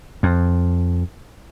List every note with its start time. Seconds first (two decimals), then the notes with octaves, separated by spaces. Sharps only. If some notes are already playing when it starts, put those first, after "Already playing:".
0.23 F2